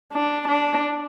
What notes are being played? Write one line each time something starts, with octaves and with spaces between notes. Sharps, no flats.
D4
D4